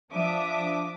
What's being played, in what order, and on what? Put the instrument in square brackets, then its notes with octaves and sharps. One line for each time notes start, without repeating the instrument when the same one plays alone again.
[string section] F3 D4 E5 D6 D#6